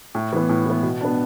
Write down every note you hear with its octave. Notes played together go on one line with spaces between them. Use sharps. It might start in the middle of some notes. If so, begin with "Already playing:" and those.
A2
E3 B3
A2
E3 B3
B2
B3 D4